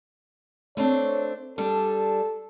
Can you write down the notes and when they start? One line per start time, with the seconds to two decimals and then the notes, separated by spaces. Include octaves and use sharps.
0.77 A3 C4 D4 C#5
1.58 G3 D4 A4